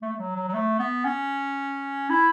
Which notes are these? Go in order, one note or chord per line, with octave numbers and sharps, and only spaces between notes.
A3
A3
F#3
F#3
F#3
A3
B3
C#4
E4